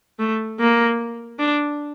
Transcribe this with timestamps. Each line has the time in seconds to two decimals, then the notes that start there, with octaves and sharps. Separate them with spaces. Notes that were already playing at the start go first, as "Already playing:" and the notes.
0.19 A3
0.60 A#3
1.39 D4